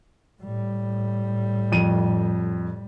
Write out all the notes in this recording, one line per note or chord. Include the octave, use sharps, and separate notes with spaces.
A2 G3
F2 D#7